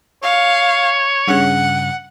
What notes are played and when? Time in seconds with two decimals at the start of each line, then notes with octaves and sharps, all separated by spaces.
0.23 C#5 F5
1.28 G2 C#3 F#5